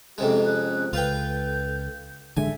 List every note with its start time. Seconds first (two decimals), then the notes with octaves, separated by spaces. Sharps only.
0.18 F2 C3 G#3 C#4 G4 G5
0.44 C#4 F#6
0.93 C#2 F4 A4 B4 G5 G6
2.37 A1 D3 G#3 A4 E5 G#5